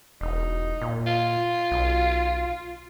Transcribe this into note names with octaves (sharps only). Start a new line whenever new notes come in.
E1 D#4
A#2
F4
B1